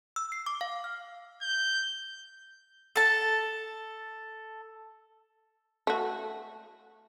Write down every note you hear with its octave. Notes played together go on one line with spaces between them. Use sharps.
E6
C7
D6
F5
F6
G6
A4 A5
A3 F#4